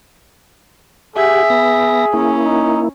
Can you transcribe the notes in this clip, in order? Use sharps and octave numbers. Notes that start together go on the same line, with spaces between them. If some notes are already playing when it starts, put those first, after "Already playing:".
G4 G#4 E5 F#5 G#5
B3 A#6
A#3 C#4 E4
D#4